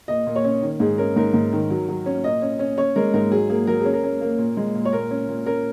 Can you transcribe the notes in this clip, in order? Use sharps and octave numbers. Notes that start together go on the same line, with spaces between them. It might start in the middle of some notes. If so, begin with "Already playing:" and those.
A#2 D#5
A#2
C#5
C#4
D#3
G#2 G#4
C#4 A#4
G#2 A#4
G#2
D#3
F#3
F#3
C#4
A#2 D#5
C#4
C#4
C#4 C#5
G#3 A#4
G#2 A#4
F#3 G#4
A#3 G#4
F#3 A#4
C#4 G#4
A#4
C#4
A#3
A#2
G#3
A#2
C#5
A#2 A#4
C#4
A#2
C#4 A#4